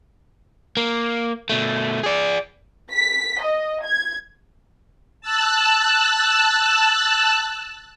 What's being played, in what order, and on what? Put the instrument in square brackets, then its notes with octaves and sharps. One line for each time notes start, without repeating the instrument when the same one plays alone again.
[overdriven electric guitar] A#3
B2 A3
G#4 D5
[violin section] B6
D#5
G#6
[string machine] A5 E6 F#6